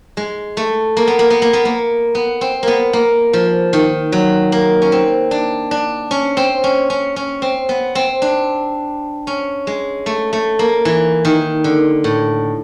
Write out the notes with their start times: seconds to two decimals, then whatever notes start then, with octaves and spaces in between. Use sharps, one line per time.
0.17 G#3
0.57 A3
0.97 A#3
1.08 B3
1.19 A#3
1.30 B3
1.42 A#3
1.53 B3
1.65 A#3
2.15 B3
2.41 C4
2.63 A#3 B3
2.93 A#3
3.33 F3
3.73 D#3
4.12 F#3
4.52 A#3
4.82 C#4
4.92 C4
5.31 D4
5.71 D4
6.11 C#4
6.37 C4
6.64 C#4
6.90 C#4
7.16 C#4
7.42 C4
7.69 B3
7.95 C4
8.22 D4
9.27 C#4
9.67 G#3
10.06 A3
10.33 A3
10.59 A#3
10.85 E3
11.25 D#3
11.64 D3
12.04 A2